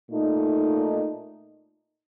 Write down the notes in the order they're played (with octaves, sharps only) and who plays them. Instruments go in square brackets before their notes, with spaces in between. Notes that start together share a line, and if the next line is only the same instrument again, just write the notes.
[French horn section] A#2 A3 D#4